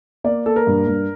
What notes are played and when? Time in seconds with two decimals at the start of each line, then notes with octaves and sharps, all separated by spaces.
0.24 A#3 D5
0.46 A#3 A4
0.56 A#4
0.67 G2
0.87 G2